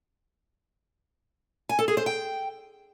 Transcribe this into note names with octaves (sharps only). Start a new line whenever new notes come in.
G#5
A4
G#4
C5
G5